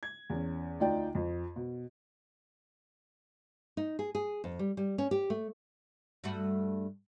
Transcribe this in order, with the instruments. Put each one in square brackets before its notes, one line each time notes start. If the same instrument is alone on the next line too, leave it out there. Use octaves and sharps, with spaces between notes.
[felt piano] G#6
E2 C#4
D2 D#4 F4 D5 G5
F2
B2
[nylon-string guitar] D#4
G#4
G#4
F2
G3
G3
C#4
G4
A3
[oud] G2 A3 F#4